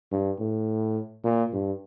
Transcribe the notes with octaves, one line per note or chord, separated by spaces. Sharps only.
G2
A2
A#2
G2